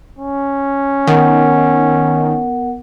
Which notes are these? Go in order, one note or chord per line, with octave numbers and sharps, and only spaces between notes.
C#4
D#3 B3 A#4 F#5